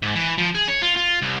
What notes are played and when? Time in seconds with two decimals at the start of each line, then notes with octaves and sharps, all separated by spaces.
0.02 G#2
0.15 E3
0.38 F3
0.55 G#4
0.68 C#5
0.82 F4
0.96 F4
1.22 C2